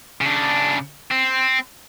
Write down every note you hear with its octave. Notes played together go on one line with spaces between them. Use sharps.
C#3 D4
C4